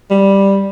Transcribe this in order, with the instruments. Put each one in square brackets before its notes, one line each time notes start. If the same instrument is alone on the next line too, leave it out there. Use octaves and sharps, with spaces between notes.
[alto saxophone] G3